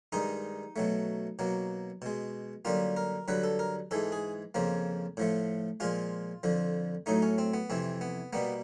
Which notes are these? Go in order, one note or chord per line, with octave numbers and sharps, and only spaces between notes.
G2 D#3 G#3 D#4
B2 F#3 A3
B2 F#3 A#3
B2 G#3
F#2 D3 G3 A#3 F4
A#4
G2 D3 F#3 B4
A4
A#4
G#2 E3 G#3 A4
G#4
F2 C#3 F3 A#3
A2 F3 A3
A#2 F3 G#3 F4
F2 D3 F3
A2 F#3 A3 D#4
C#4
C4
B3
F2 C3 E3 C4
B3
B2 G3 A#3 B3